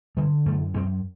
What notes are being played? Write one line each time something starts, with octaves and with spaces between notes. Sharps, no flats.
D3 G3
F#2 A3
F#2 C4